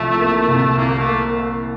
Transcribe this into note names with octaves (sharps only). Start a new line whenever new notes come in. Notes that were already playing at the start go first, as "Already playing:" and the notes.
Already playing: C2 F3 A3
A#3
C2
C2 A#3
A3
A#3